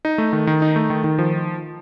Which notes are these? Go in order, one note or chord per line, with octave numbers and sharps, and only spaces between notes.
D#4
A3
D#3
D#3
D#4
A3
D#3
D#3
F3